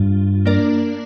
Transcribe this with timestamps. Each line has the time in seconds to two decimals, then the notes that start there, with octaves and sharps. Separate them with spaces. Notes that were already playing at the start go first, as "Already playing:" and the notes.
Already playing: G2 F4
0.45 A#3 D4 A#4 D5